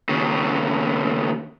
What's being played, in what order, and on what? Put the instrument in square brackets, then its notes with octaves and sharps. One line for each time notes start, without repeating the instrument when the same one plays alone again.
[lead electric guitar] D#2 C#3